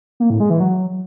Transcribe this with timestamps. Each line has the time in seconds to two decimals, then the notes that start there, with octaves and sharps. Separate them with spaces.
0.20 A#3
0.30 A2
0.40 G#3
0.50 E3
0.60 F#3